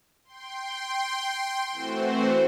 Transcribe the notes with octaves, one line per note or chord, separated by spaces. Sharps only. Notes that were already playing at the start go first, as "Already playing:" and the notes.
G5 C6
E3 A3 C4 F#4 C5